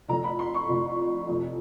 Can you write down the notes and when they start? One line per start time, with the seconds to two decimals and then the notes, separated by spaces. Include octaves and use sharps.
0.08 F1 F2 D3 A#5
0.24 B5
0.39 C6
0.54 C#6
0.69 F1 F2 D3
1.28 F1 F2 C3